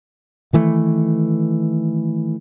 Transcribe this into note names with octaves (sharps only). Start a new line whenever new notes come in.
D#3 E3 A3